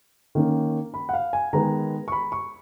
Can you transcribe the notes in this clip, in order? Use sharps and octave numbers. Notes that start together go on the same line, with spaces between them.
D#3 A#3 C#4
B5
F#5
F5
G#5
D#3 G#3 B3 A#5
C#6
B5
C#6